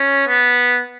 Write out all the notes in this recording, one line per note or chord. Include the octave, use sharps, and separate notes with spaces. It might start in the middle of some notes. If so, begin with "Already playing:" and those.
Already playing: C#4
B3